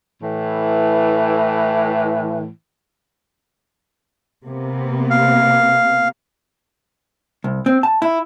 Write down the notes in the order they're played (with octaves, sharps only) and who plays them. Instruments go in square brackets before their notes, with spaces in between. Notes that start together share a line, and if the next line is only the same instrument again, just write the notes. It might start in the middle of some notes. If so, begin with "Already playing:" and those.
[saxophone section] A2 E3
[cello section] C3 A#3 B3
[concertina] F5
[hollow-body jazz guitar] C2
C4
A5
E4